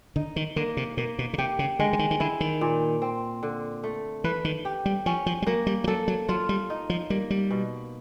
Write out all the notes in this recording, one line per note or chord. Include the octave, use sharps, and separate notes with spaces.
D3 D#4
D#3
D3 A#3
C3
B2 A#3
B2
C#3
C3 G4
C#3
D3 G#3
D3
D#3
D#3
D3 E4
D#3
A#2
C4
D3
A3
E3 B4
D#3
G4
G3
F3 C#4
F3
G3
F#3 A#3
G3
F3
F#3 A4
F#3
F#3 F4
G3
D#4
F3
G3 A#3
G3
B2